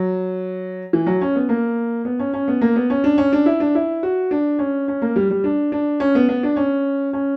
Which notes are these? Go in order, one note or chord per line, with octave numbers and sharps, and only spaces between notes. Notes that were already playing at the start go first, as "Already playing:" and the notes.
Already playing: F#3
E3
F#3
C#4
B3
A#3
B3
C#4
C#4
B3
A#3
B3
C#4
D4
C#4
D4
E4
D4
E4
F#4
D4
C#4
C#4
A#3
G3
G3
D4
D4
C#4
B3
B3
D4
C#4
C#4